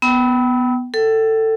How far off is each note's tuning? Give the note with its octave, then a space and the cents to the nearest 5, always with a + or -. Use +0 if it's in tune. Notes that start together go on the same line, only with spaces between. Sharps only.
B3 +0 G5 -30 E6 -35
A4 +15 G5 -40